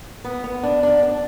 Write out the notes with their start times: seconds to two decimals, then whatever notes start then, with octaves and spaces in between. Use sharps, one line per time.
0.24 B3
0.44 B3
0.63 D4
0.83 D4
1.03 D4